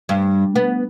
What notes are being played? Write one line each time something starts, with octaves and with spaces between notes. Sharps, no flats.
G2
B3